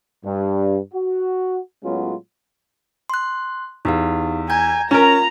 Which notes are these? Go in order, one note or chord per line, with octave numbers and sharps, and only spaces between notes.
G2
F#4
A2 F#3 G#3 B3 C#4 F4
C6 F#6
E2 D#4 G4 F5
G#5 A#5 G6 G#6
C#4 F4 A#4 A#5